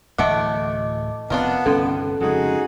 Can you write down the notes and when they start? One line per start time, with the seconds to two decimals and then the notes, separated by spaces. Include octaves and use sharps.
0.18 D1 A2 E3 A3 D#5 E5 F#5 D6
1.30 F1 B3 C4 D4 F4 A#4
1.66 G1 C2 D#3 C#4 A4
2.20 F2 C#3 G#3 D#4 F#4 G#4